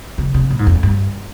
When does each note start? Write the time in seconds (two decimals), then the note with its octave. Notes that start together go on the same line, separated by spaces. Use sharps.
0.18 C#3
0.34 C3
0.51 A#2
0.59 G#2
0.67 F2
0.83 G2